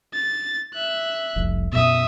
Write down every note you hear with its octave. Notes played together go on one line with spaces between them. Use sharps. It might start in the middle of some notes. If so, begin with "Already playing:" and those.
A6
E5 F#6
F1 C2 F2
F#2 B2 E5 D#6